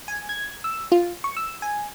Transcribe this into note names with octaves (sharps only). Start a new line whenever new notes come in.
G#5
G#6
E6
F4
C#6
E6
G#5